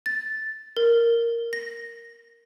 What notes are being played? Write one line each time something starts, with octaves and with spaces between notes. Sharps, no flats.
A6
A#4
A#6